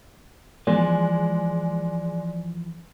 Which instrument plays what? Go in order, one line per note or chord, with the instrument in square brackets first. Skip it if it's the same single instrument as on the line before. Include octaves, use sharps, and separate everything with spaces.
[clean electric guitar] E3 F3 [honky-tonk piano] G#3 [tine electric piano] D5